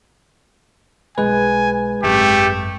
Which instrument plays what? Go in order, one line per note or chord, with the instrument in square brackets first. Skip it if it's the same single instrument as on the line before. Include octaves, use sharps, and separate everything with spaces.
[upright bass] B1 [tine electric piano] G#3 B4 [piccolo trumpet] G#5
[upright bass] G#1 F#2 [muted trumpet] A3 [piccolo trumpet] G4